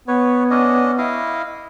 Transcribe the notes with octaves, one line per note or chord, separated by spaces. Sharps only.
B3 B4 C#5
C#4 D4 D#5
E4 D#5 F5